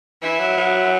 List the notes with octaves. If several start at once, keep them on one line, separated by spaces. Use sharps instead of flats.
E3 E4
F#3
F#3